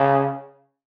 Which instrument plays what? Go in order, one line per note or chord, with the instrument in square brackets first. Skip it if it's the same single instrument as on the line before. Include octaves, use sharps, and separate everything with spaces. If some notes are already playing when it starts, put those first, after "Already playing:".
Already playing: [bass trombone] C#3